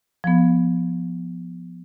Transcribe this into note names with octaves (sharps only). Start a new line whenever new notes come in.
F3 B3